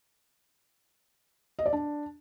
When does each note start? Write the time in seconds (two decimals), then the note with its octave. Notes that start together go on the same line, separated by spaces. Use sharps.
1.59 D#5
1.66 D5
1.73 D4